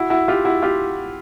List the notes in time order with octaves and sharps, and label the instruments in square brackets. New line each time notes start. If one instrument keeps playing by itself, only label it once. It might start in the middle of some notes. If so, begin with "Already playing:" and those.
Already playing: [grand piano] E4 F#4
E4 F#4
F4 G4
E4 F#4
F4 G4